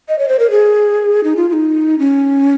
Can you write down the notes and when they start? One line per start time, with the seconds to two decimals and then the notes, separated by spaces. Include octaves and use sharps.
0.09 D#5
0.19 C#5
0.28 C5
0.39 A#4
0.51 G#4
1.24 D#4
1.36 F4
1.49 F4
1.53 D#4
1.99 C#4